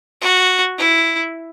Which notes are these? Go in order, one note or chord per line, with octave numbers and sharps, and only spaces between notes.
F#4
E4